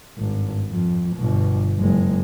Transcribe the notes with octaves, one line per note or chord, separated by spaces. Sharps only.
G#1 G2
F2
G1 B2
F#1 G#3